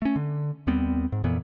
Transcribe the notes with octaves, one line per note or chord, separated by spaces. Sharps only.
A3 C#4
D3
D#2 G3 B3 C4
G#2
F2 A#2 E3 B3